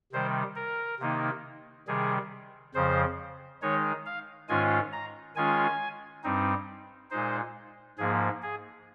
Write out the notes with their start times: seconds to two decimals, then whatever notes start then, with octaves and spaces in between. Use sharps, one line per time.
0.12 C3 D#3 G3 C5
0.56 A#4
1.00 C3 D#3 A#3 D#4
1.87 C3 D#3 G3 G#4
2.74 F2 C#3 F3 C5
3.62 D#3 G#3 D#4 C#5
4.06 F5
4.49 G#2 D#3 G#3 C#4 F4 G#5
4.93 A#5
5.36 D#3 G#3 C#4 F4 G#5
6.23 G2 G3 C4 D#4
7.10 A#2 G#3 D#4 C5
7.98 G#2 F3 A#3 G#4
8.42 G#4